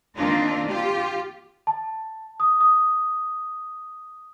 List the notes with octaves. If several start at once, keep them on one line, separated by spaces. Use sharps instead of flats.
D#3 A#3 C4 D4 D#4 F4
F4 G4
A5
D#6
D#6